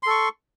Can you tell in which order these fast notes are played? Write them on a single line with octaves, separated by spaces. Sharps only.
C6 A4 C#6